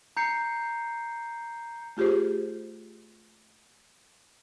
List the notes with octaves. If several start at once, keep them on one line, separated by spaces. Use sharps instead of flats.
A#5 G6 C7 C#7
A3 F4 G4 G#4 C5